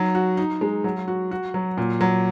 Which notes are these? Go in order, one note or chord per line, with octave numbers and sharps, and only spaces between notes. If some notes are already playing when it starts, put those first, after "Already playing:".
Already playing: F#3 D#4
F#4
D#4
G#3
F#3
F#4
F#4
F#3
A#2
F#3